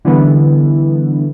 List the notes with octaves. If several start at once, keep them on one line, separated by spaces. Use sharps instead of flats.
D3 E3 G3 B3